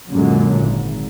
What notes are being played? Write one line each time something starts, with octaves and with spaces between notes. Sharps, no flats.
F#2 A#2 D3 F#3 G#3
G#1